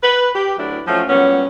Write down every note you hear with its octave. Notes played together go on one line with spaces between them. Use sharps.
B4
G4
D2 F#3 D4 E4
F3 F#3 A3 C#4 F4
A#2 F#3 G3 B3 C#4